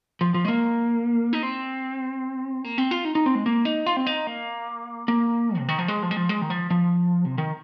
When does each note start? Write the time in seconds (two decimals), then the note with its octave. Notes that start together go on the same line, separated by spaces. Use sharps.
0.21 F3
0.34 F3
0.45 G#3
0.48 A#3
1.33 D#4
1.43 C4
2.64 A#3
2.78 C4
2.91 F4
3.05 D#4
3.15 D#4
3.26 C4
3.35 G#3
3.46 A#3
3.65 D#4
3.87 F4
3.97 C4
4.07 D#4
4.27 A#3
5.08 A#3
5.58 C3
5.68 D#3
5.79 F3
5.88 G#3
6.03 F3
6.11 G#3
6.17 F3
6.29 G#3
6.41 D#3
6.50 F3
6.70 F3
7.25 C3
7.38 D#3